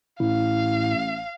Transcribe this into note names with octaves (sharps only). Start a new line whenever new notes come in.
A1 A2 E4 F5